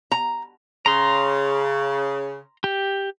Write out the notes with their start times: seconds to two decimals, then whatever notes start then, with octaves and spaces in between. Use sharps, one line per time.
0.12 A#5
0.86 C#3 A#5 C6
2.64 G4